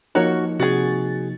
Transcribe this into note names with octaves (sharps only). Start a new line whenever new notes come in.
F3 A#3 D#4 F#4 A#4 C#5
C3 F#4 G#4 A6